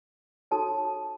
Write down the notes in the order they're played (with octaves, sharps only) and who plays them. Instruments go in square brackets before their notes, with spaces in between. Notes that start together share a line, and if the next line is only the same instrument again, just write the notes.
[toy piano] D#4 F#4 A4 C#5 A5